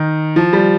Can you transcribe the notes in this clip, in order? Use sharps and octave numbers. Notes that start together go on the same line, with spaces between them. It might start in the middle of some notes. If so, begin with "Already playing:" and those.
Already playing: D#3
F3
G3